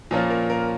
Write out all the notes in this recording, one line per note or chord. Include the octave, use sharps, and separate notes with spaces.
A#2 F3 A#3 C#4
A#4
A#4